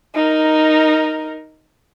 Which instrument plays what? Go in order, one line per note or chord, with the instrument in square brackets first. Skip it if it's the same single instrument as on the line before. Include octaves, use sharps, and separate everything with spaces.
[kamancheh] D#4 A#4